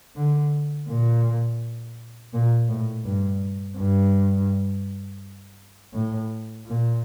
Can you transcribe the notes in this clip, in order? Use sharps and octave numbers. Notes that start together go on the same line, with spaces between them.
D3
A#2
A#2
A2
G2
G2
A2
A#2